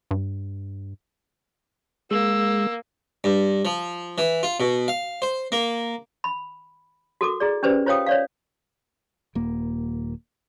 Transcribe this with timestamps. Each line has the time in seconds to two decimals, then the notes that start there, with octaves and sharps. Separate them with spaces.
0.11 G2
2.11 G#3 A#3 E6
3.24 G2
3.65 F3
4.18 E3
4.43 F4
4.60 B2
4.88 F5
5.22 C5
5.52 A#3
6.24 B5
7.21 F#4 A4 A#4 D6
7.40 E4 G#4 D5
7.63 C#4 G4 B4 C5 D5
7.86 F4 C5 C#5 F5 G5 D#6
8.06 C#5 D5 F5
9.35 D#1 A#3